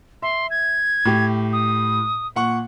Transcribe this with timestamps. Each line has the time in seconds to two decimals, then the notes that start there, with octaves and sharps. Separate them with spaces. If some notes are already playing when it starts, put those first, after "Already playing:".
0.22 E5 C6
0.50 G#6
1.05 A2 G4
1.53 D#6
2.36 A#2 F#5 C#6